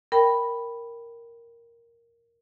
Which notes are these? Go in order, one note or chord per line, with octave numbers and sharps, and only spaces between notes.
A#4 G5 B5